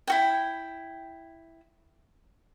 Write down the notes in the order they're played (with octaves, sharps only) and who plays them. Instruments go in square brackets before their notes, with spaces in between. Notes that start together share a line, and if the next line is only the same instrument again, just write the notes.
[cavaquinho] E4 F#4 G5